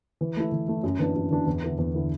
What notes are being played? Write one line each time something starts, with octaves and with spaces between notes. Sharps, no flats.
E3
A3 E4
E3
A3 E4
F#2
E3 B3 D4
F#2
E3 B3 D4
E2
D3 B3 E4
E2
D3 B3 E4